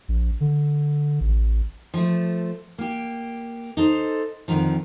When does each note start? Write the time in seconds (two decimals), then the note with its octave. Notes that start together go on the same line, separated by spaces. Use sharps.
0.08 A#1
0.40 D3
1.20 A1
1.94 F3 A3
2.78 A#3 G4
3.77 D#4 A4 C5
4.48 F2 G#2 D3 D#3 F3